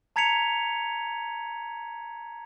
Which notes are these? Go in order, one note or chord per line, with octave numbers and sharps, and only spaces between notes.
A5 A#5 G#6 B6 C#7 F7